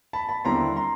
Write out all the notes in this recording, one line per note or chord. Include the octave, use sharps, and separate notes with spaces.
A5 B5
A5 B5
D#2 D3 G3 C4 E4 A#5 C6
A#5 C6